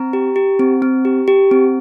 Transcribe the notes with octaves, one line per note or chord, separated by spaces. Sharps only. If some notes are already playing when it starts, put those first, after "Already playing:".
Already playing: C4 A#5
G4
G4
C4
C4
G4
G4
C4